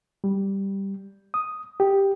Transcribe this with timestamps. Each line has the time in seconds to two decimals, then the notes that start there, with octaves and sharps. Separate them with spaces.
0.24 G3
1.34 D#6
1.80 G4